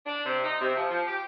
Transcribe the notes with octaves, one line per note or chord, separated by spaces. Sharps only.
D4
C3
D#4
C3
F3
F3
G4